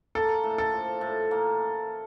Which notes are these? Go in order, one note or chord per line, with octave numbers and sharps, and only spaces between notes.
A#3 A4
A2
A4
F3
A2
A#3